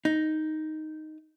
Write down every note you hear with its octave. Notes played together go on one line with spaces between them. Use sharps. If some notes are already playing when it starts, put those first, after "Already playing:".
D#4